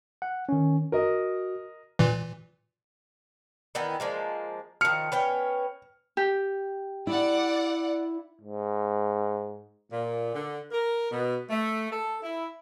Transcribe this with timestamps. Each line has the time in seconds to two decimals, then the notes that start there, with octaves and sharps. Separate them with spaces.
0.22 F#5
0.49 D#3 C#4
0.92 F#4 A#4 D#5
1.99 A#2 E3
3.75 D#3 E3 B3
4.00 F3 G#3 A#3
4.81 D#3 F3 F6 C#7
5.12 B3 C#4 G5
6.17 G4
7.07 E4 D5 F#5
8.41 G#2
9.91 A#2
10.35 D3
10.72 A#4
11.11 B2
11.49 A3
11.90 A4
12.22 E4